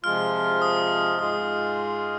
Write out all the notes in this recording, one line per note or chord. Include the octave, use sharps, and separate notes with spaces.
C3 F3 G#3 F4 F6
D#6
G#2 G#3 F4 G#4 D#6